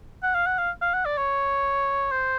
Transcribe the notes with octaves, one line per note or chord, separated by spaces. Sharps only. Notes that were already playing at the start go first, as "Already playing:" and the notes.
F#5
F5
F#5
F5
F5
F#5
D5
C#5
C5